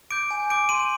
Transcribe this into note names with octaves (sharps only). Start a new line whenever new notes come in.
D6 G6 D7
G#5
D6 G6 D7
C6 D#7